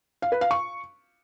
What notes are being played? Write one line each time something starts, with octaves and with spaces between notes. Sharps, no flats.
F5
B4
F5
C#6